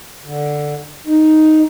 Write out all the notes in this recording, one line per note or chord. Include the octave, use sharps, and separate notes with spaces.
D3
D#4